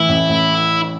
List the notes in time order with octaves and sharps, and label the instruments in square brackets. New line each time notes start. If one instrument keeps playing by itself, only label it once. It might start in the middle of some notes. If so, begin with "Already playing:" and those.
Already playing: [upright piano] A2 E3 [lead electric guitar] E4
[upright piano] A1
A1